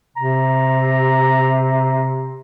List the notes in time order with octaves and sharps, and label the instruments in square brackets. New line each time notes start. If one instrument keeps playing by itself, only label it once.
[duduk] C3 [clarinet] A#5